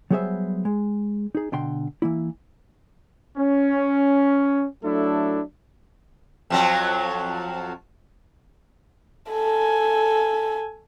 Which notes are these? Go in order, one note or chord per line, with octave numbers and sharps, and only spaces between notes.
F#3 G3 B3 G#4 C5 E5
G#3
D#4 G#4
B2 D3 G5 C6
E3 A#3 E4
C#4
F#3 A3 D4 E4 A4
F2 F3 F#3
A4 G#5